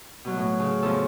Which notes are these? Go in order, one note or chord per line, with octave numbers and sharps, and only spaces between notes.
B2 F#3
A2
C#3
E2 F3 A4